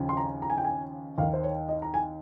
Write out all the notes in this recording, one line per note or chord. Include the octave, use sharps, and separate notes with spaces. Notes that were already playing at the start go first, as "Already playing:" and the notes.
Already playing: D#2 C#3 F3
C6
A#5
A#5
G#5
G5
G#5
D#2 D#3 F5
C5
C#5
D#5
A#5
G#5